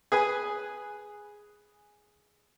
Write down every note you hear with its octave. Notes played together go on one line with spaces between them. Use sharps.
G#4 B4 G#5